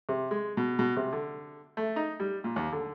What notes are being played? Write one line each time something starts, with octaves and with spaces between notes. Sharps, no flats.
C3
G#3
B2
B2
C3
D3
A3
D#4
G3
A#2
D#2
D3